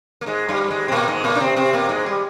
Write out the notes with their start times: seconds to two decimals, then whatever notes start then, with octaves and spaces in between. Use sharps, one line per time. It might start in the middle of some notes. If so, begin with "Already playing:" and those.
0.21 A#3
0.26 G#2 G#3
0.48 G2 G3
0.71 G#2 G#3
0.88 C4
0.92 A#2 A#3
1.08 G#2 G#3
1.24 A#2 A#3
1.35 D4
1.40 C3 C4
1.56 C3 C4
1.73 A#2 A#3
1.89 G#2 G#3
2.06 G3